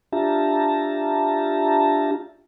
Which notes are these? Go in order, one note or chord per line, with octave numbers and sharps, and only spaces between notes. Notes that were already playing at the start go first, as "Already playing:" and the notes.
D4 F4 G4 E5 A5 A#5